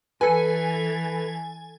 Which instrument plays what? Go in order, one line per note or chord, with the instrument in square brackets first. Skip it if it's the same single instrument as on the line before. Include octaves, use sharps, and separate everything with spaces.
[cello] E3 [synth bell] A4 G#5 [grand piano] B4